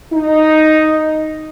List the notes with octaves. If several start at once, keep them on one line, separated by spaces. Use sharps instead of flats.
D#4